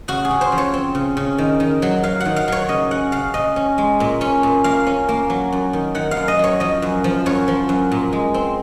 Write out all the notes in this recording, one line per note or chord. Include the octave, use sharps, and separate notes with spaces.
C#3 F#4
G#4
C#3
C5
F3
C#5
C4
C#3
C#3
D#3
D#3
F#3
F#3 F5
D#3 F#5
F5
F#3 C#5
C#3 D#5
C#4 F#5
C#3 F5
C#3 D#5
C#4
G#3
A#2
C#4
A#2
A#3 F5
C#4
A#3
F#3
F#2
D#3
D#3 F#5
F5
F#2
D#5
F#3 C#5
F3 D#5
F#2
F3
F#2 C#5
F3
F#2
A#2
G#3
C4